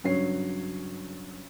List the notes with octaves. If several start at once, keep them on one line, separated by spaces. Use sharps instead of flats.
G2 C#3 F#3 C#5 C7